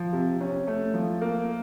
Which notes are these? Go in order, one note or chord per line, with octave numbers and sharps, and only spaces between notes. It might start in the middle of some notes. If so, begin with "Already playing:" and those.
Already playing: F3
C3
C#4
A3
F3
A#3